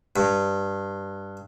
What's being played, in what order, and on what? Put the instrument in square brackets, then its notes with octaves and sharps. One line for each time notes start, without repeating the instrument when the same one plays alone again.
[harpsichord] G2